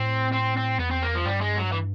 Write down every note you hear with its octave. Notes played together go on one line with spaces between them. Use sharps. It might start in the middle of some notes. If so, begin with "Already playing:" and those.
Already playing: A2 C4
C4
C4
E2 B3
C4
A#3
F3
G2 G3
G#3
F#3
E3